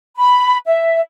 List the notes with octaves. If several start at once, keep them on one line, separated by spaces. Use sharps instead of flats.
B5
E5